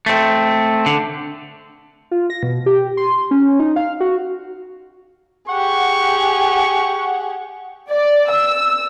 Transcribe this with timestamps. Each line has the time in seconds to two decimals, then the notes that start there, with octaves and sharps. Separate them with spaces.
0.06 A3 C4
0.86 D3
2.11 F4
2.30 A#6
2.43 B2
2.66 G4
2.97 C6
3.31 C#4
3.60 D#4
3.76 F5
4.00 F#4
5.49 G4 G#4 F#5 C#6
7.92 D5
8.31 E6